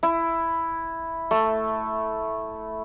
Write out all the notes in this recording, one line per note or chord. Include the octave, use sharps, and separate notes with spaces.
E4
A3